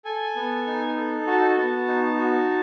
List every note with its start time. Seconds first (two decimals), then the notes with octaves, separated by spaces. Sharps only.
0.05 A4 G#5
0.36 B3
0.67 D#4
0.97 A4
1.27 F#4 A5
1.57 B3
1.88 D#4
2.18 F#4